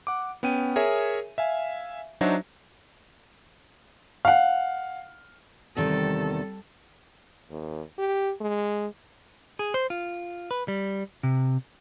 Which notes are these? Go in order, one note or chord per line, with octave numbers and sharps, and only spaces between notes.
F#5 D6
B3 C#4 G5 D#7
G#4 A#4 C#5 E5 G#5
E5 F5 G#5
F#3 D4 D#4 F#4 C5 E5
F5 F#5
E2 C3 D#3 G3 A4
D#2
G4
G#3
G#4
C5
F4
B4
G3
C3